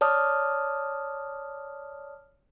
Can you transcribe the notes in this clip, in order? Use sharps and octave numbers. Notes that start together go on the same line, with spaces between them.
C#5 D5 A5 D#6 F6